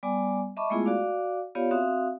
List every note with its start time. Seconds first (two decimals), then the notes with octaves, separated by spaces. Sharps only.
0.03 G3 B3 D5 G#5 D6
0.57 D#5 E5 A5 B5 C#6 D6
0.70 G#3 A3 B3 E4 F4 G#4
0.85 F#4 D5 F5 D6
1.55 B3 F4 G4 C#5 D5 F5
1.71 C4 F#4 E5 F5 D#6